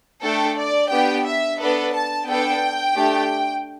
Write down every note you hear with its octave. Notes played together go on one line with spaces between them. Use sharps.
A3 D4 A4 G5
D5
B3 D4 G4 G5
E5
B3 D4 A4 B4
A5
B3 D4 A4 G5
A3 D4 G4